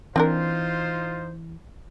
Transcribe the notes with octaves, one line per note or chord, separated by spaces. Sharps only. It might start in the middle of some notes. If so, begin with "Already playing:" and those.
E3 C4 D4 D#4 F4 A#4 C5